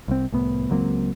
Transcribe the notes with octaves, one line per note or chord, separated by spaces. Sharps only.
C2 C4
C2 A2 B3
C#2 F#3 A#3 C4